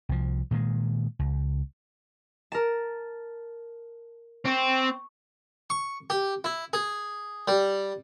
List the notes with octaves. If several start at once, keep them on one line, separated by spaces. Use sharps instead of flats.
C2 F3
A#2 D#3 F#3 G#3
C#2
A#4 A5
C4 C#6
C#6
G4
E4
G#4
G3